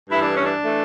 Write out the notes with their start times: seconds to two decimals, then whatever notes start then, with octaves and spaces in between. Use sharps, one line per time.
0.10 G2 E3 A3 E4
0.21 D4
0.34 C#4
0.45 D4
0.63 E3 A3